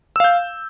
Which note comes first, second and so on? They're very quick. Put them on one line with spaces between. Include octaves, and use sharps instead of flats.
E6 F5 G6